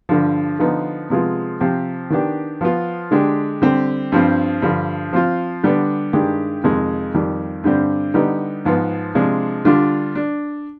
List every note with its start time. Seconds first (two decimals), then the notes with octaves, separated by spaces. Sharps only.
0.09 G2 D3 F3
0.59 D3 F3 B3 D#4
1.10 C3 F3 G#3 B3 F4
1.60 C3 F3 C4 G4
2.10 D#3 B3 D4 G4
2.61 F3 B3 F4
3.11 D3 G#3 D4 G4
3.62 D3 G3 C4 G4
4.12 G2 F3 C4
4.62 G2 D3 F3
5.13 F3 C4 F4
5.63 D3 G3 B3 D4
6.13 G2 D#3 G#3 D4 G4
6.64 F2 C3 D#3 G#3
7.14 F2 D#3 G3
7.64 G2 D3 G3 C4
8.14 D3 G3 B3 D#4
8.65 G#2 F3 B3
9.15 C3 F3 G#3 D4
9.65 D3 G3 D4 F4
10.15 D4